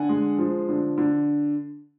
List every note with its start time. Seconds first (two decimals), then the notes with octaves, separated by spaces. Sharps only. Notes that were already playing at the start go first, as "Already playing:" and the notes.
Already playing: D3 F#5 G#5
0.09 G#3
0.38 F3
0.69 D3
0.98 D3